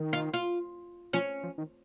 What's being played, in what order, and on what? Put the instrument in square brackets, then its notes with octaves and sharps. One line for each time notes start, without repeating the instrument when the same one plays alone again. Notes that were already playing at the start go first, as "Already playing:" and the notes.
Already playing: [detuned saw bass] D#3
[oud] F4
F4
[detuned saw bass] F3 [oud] C#4
[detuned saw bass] F3
D#3